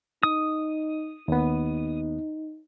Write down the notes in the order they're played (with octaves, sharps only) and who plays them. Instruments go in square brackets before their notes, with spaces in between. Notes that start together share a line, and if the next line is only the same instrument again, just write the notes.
[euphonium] D#4 [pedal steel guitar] D#6
[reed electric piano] D#2 B3 [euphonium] D#4